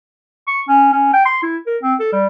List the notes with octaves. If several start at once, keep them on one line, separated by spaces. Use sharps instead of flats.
C#6
C#4
C#4
G5
C6
E4
A#4
C4
A4
G3